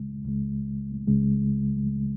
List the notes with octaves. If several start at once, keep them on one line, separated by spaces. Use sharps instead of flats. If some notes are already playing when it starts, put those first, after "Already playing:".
Already playing: C#2 C#3 G#3
C#2 C#3 G#3
C#2 C#3 G#3